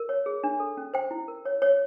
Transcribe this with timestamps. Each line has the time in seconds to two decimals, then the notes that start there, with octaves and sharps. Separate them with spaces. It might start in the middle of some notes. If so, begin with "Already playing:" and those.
Already playing: A#4
0.09 C#5
0.26 G#4
0.44 D4
0.60 A4
0.77 C#4
0.94 C5 G5
1.11 E4
1.28 A#4
1.45 C#5
1.62 C#5